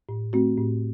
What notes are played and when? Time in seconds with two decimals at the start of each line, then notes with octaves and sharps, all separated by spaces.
0.09 A2
0.33 A3 C4 F#4
0.58 A2